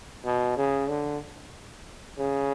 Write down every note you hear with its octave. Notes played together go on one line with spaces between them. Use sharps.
B2
C#3
D3
C#3